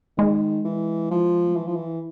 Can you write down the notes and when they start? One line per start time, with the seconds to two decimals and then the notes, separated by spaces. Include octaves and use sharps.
0.18 D#3 G#3
0.65 E3
1.11 F3
1.56 E3
1.67 F3
1.76 E3